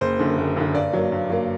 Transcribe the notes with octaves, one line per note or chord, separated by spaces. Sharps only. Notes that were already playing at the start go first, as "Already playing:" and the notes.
F#1 C5
F#2 D3
F#1
F#2 D3
G2 D5
F#3 A#3
G2
F#3 A#3